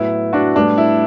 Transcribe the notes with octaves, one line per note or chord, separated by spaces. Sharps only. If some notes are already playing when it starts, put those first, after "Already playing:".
Already playing: A2 F#3 B3 E4
D4 F#4
A2 G3 B3 D4
E4